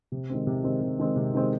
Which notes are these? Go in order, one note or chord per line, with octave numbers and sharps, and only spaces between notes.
C3
D#3 G#3 C4
C3
D#3 G#3 C4
C3
D#3 G#3 C4
C3
D#3 G#3 C4